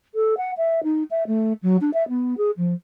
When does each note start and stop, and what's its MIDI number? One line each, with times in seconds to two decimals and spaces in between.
0.14 0.37 69
0.37 0.51 78
0.57 0.83 76
0.83 1.03 63
1.11 1.23 76
1.27 1.53 57
1.62 1.77 54
1.81 1.90 62
1.94 2.07 76
2.08 2.34 59
2.38 2.51 68
2.57 2.74 53